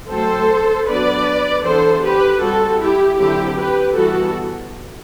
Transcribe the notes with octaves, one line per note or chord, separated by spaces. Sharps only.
F#3 A3 C4 A4 C5
F#3 B3 D4 B4 D5
E3 B3 D4 A4 C5
G4 B4
G3 C4 F#4 A4
E4 G4
D3 F#3 C4 E4 G4
G4 B4
E3 G3 B3 F#4 A4